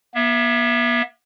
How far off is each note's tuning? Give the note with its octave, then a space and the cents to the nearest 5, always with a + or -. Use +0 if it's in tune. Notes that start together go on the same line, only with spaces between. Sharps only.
B3 -45 E5 +10